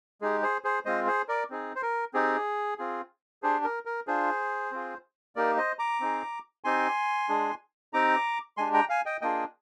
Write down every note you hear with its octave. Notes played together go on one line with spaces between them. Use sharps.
G#3 D#4 G4 G#4
G#4 C5
G#4 C5
G#3 C4 F4 C5 D#5
G#4 C5
A#4 D5
C4 D#4 G#4
C5
A#4
C4 D#4 G4 G#4
C4 F4 G#4
D4 G4 G#4 C5
A#4
A#4
D4 F4 G#4 C5
C4 F4 G#4
A#3 D#4 G4 A#4 D5
C5 D#5
A#5 D6
C4 D#4 G#4
C4 D#4 G4 G#5 C6
G#3 D4 G#4
C4 D#4 G4 A#5 D6
G#3 D4 G4 G#5 C6
G5 A#5
F5 G#5
D#5 G5
A#3 D4 F4 G#4 D#5 G5